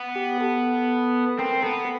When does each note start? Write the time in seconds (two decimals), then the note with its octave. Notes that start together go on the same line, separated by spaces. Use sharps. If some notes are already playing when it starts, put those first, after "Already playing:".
Already playing: B3
0.16 G4
0.41 A4
1.39 C4 A#4
1.63 B3 A4